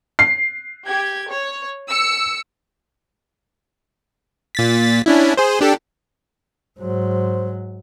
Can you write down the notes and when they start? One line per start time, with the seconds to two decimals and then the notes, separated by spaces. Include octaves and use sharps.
0.19 C7
0.86 G4 G#6
1.32 C#5
1.88 E6 C#7
4.55 A#2 A6 B6
5.06 C#4 D4 E4
5.37 G#4 C5
5.61 D4 G4 A4
6.79 G#2 F#3 C5